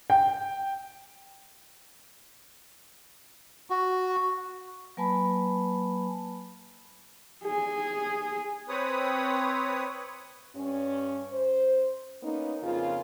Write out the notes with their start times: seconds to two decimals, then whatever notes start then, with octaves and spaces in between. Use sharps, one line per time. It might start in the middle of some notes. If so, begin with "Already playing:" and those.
0.10 G5
3.70 F#4
4.97 F#3 A#3 B4 G#5 A5 B5
7.45 G#4
8.69 C4 B4 C#5 D#6
10.55 G2 C#4
11.33 C5
12.22 A#3 B3 C#4 D#4
12.62 F2 C#3 A#3 F4